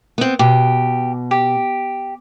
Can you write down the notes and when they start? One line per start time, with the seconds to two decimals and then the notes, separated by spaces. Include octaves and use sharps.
0.18 B3 C4
0.39 B2 G4
1.31 G4